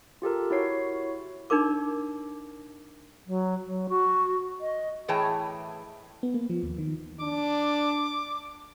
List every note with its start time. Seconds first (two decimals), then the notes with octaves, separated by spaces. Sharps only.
0.22 F4 G4 A4 A#4
0.50 E4 F#4 C#5 C7
1.50 D4 D#4 A#4 D6
3.27 F#3
3.65 F#3
3.89 F#4
4.61 D#5
5.08 A2 E3 G#4 C#5 G5 A5
6.23 B3
6.34 A#3
6.50 F3
6.63 D#2
6.78 D#3
7.20 D4 D6